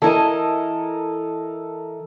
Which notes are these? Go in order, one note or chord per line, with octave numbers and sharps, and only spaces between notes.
E3 E4 A4 A#4 D#5